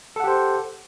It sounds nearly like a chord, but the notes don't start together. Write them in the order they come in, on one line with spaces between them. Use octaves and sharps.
A4 F#5 G4 C5